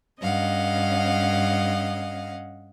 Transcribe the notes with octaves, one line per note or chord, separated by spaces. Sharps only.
G2 C#4 D#5 F5 F#5